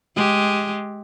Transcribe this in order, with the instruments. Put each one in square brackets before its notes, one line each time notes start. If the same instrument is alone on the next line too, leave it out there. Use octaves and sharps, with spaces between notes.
[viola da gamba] G#3 G4